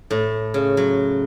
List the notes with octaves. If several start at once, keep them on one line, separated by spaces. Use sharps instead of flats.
A2
C#3
F#3